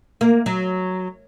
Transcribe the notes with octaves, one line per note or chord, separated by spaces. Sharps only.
A#3
F#3